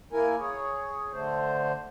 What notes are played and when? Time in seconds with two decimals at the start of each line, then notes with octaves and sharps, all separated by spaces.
0.13 A#3 E4 A#4 G#5
0.40 G#4 C#5
1.13 D3 A3 C5